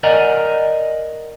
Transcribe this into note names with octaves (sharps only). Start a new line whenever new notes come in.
A#4 D5 D#5 F#5 G#5 A#5